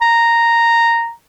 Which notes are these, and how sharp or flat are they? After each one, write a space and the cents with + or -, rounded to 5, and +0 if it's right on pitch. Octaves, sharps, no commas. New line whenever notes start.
A#5 -5